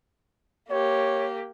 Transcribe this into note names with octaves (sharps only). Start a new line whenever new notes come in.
A#3 G4 C#5